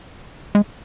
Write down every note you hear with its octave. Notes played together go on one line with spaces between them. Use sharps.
G#3